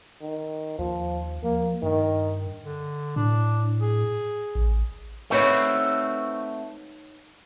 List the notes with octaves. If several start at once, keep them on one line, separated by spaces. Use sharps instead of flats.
D#3
D#2 F3
F3 A#3
G2 D#3
D3
A2 D4
G#4
A1
A3 C4 D#4 F#4 B4 C#5